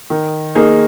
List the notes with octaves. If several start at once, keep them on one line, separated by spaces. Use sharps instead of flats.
D#3
A#3 D#4 G#4